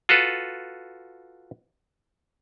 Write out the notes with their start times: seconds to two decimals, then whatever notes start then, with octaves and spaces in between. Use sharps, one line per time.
0.09 F4 F#4 A4 B4